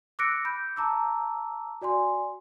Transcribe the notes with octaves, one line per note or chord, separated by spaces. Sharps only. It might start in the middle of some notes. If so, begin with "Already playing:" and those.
D6 E6 F#6 A#6 C#7 D7
B5 G6
A5 A#5 D6 E6
F#4 D5 G#5 C6